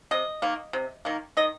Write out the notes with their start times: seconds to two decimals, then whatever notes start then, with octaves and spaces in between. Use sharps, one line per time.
0.11 C3 D#5
0.42 D#3 A#3
0.73 C3
1.05 D#3 A#3
1.37 D#3 D#5